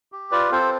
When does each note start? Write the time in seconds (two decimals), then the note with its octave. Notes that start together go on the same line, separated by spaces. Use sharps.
0.12 G4
0.31 F4 B4 D5
0.52 C4 A4 C5